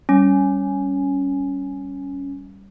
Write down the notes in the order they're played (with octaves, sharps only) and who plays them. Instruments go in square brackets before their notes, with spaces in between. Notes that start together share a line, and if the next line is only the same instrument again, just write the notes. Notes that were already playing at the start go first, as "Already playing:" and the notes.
[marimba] G3 [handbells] C#4